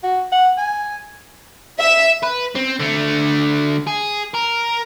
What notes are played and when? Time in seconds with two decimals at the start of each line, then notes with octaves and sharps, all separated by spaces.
0.03 F#4
0.32 F#5
0.58 G#5
1.80 E5
2.23 B4
2.56 C4
2.80 D3 A3
3.87 G#4
4.34 A#4